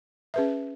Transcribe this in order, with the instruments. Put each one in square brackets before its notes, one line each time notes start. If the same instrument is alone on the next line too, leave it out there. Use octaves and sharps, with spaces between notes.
[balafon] C#4 G#4 B4 E5